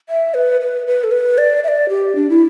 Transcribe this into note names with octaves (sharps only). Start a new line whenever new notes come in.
E5
B4
B4
B4
A4
B4
D5
E5
D5
G4
D4
E4